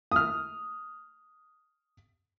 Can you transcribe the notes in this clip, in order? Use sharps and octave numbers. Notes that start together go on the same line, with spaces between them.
D#6 F6